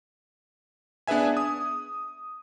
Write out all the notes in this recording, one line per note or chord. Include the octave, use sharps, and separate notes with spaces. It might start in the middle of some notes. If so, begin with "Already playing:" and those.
B3 D4 G#4 B4 E5 G#5
D#6